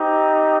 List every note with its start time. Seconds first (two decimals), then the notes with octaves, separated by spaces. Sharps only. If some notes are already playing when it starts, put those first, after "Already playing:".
Already playing: C4 D#4 G4